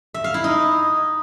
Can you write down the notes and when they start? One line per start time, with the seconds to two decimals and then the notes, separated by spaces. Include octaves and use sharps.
0.14 E5
0.24 F5
0.34 E4
0.44 D#4